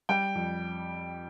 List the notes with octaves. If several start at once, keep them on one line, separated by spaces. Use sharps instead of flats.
G3 G5
F2